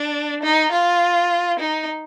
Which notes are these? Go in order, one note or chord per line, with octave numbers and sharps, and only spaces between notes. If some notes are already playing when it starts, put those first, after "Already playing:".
Already playing: D4
D#4
F4
D#4